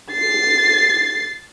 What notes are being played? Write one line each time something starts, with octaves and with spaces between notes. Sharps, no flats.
A6 C7